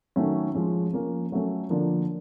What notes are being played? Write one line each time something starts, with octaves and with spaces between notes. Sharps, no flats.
D#3 F#3 A3 C#4
F3 G#3 C#4
F3 A#3 C#4
F#3 A3 C#4
D3 F3 A#3 D4